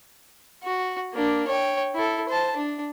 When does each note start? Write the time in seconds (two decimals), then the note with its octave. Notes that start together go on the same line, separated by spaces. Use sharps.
0.63 F#4
1.14 A#3 D4
1.47 C#5 G5
1.95 E4 A4
2.28 C5 A5
2.56 D4